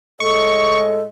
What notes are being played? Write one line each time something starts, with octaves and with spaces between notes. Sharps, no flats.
A2 G#3 A4 D#5 C#6